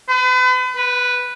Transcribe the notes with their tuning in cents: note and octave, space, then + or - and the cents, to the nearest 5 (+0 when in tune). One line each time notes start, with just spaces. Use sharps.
B4 +40
B4 +0